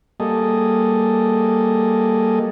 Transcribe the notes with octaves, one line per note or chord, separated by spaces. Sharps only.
G3 A#3 G#4 A4 D#5